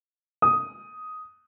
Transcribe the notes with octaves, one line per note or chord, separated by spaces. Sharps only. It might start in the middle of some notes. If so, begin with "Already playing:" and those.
D#6